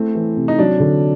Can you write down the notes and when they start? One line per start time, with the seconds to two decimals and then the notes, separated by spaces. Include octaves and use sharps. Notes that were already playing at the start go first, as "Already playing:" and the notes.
Already playing: A3 C4 E4
0.15 E3
0.37 C3
0.48 D#4
0.59 F#3 D4
0.80 D3